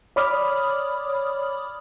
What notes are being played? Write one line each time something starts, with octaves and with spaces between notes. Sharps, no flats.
C#5 D5 B5 D6 D#6 F6